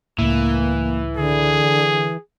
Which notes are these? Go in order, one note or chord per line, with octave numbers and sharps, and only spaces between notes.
C#2 A2 E3 A#3
D3 G#4